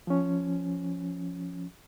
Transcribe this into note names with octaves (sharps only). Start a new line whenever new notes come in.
F3 C#4